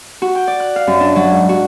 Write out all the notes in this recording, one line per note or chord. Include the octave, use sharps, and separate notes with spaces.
F#4
G5
D5
F#6
F5
F#2
D4
F#3
G#2
F#4